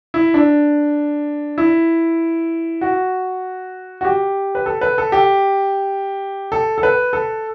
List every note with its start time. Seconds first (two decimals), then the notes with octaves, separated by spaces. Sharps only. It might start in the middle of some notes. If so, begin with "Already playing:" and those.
0.14 E4
0.34 D4
1.58 E4
2.81 F#4
4.01 F#4
4.05 G4
4.55 B4
4.66 A4
4.81 B4
4.98 A4
5.12 G4
6.52 A4
6.78 A4
6.83 B4
7.13 A4